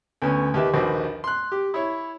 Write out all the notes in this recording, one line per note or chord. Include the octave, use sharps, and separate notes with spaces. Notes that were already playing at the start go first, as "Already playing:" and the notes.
D2 B3 C#4
D#2 G4 B4 E5
A#1 D#2 F#4 B4 C5
C6 F#6
G4
E4 C#5